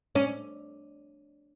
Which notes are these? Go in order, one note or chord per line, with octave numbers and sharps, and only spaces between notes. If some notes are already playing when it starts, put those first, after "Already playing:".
C#4